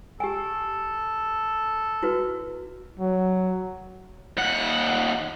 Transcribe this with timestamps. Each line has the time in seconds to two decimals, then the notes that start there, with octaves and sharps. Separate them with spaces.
0.20 G4 A4 G#5
2.03 E4 F#4 B4
2.99 F#3
4.37 D#2 F#5